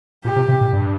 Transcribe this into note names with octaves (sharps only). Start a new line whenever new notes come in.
A#2 G4
C3
C3
A#2
G2